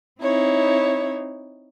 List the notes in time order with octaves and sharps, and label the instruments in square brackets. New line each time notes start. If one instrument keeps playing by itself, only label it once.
[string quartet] C4 D#4 E4 C#5